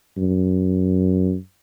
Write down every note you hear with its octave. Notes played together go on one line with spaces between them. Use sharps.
F#2